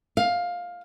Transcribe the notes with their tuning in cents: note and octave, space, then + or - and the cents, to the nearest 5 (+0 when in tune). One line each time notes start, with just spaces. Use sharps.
F5 +15